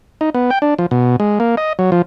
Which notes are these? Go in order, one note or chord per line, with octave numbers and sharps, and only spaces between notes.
D#4
B3
G5
D4
F3
B2
G#3
A#3
D#5
F#3
F3